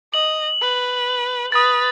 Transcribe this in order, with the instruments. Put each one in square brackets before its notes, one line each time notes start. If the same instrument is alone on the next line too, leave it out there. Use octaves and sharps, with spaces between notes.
[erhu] D#5 [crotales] F#7
[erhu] B4
[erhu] B4 [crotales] D#6 A6